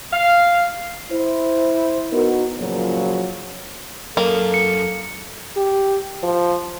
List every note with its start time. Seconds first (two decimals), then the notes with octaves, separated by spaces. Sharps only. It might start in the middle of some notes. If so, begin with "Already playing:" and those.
0.13 F5
1.12 E4 C5
2.13 B3 D#4 F#4 A#4
2.59 A#2 C#3 F3 F#3
4.17 F#2 A#3 A4
4.54 C#7
5.56 G4
6.23 F3